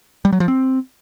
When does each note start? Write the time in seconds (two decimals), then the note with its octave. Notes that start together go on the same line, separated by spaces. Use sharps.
0.25 G3
0.33 F#3
0.40 F3
0.48 C4